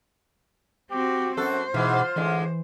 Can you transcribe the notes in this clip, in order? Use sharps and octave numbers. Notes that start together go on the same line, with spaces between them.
C4 F#4 G4
F#2 F#4 A4 C5
G#2 B2 E3 F4
A2 D3 E3 G#3